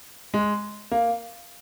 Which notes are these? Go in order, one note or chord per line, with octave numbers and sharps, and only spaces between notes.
G#3
A#3